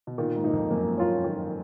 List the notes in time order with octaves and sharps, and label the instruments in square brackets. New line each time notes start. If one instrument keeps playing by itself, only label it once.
[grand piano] B2
[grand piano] A#2 [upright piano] D#3
[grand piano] G#2
[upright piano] A#3 D#4
[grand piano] F2
[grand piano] F#2 [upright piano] A#3
[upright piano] C#4 F4 A#4
D#3